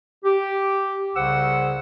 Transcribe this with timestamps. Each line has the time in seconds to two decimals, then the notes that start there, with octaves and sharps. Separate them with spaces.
0.25 G4
1.16 C2 C#3 C5 F#5 E6